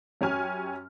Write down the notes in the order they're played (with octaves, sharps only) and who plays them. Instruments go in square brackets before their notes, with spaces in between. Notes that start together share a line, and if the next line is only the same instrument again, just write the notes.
[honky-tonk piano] F#2 C#4 G4 G#5 F6